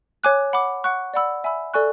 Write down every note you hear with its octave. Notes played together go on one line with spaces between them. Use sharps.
C#5 G#5 D6 F#6
F#5 B5 D6
F#5 C#6 F#6
D5 F#5 B5 E6
E5 G#5 B5 E6
A4 D5 G#5 C#6 F#6